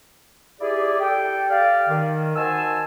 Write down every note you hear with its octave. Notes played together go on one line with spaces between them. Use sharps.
E4 G4 G#4 D5
G4 A4 G5
G4 D5 F5
D#3
D#3 F#4 C5 G#5 A5 E6